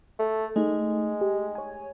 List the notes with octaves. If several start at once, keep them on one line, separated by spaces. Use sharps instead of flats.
A3
G#3 A3 D#4
G4
C#5 G#5